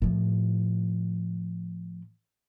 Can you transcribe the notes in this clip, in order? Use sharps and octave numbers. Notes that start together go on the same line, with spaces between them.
A2 F3